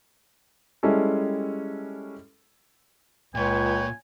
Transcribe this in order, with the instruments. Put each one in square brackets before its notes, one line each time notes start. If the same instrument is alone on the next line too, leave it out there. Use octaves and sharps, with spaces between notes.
[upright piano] G3 G#3 C#4 E4 A4
[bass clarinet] C#2 [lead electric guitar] A#2 F4 [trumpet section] B4 C#5 G5 [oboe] G#5